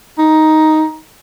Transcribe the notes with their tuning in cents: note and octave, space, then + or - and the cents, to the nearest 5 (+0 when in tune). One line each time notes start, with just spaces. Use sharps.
D#4 +5